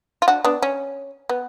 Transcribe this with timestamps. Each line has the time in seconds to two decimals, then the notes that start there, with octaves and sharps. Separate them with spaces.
0.22 F4
0.28 D4 F#4
0.44 B3 D4
0.62 C#4
1.29 B3